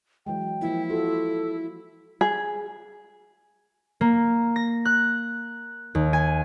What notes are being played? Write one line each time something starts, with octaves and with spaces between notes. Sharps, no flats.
E3 F#3 G#3 G5
F3 A#3 E4
F4 F#4 A4
G#4
A#3
A#6
F#6
D#2
G#5